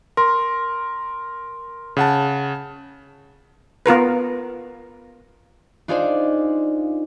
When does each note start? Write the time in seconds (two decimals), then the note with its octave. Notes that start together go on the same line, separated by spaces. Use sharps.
0.17 A#4 C6
1.97 C#3 F#5 A5
3.86 B3 F4 A#4 B4
5.88 D4 D#4 F4 G#4 C5 D5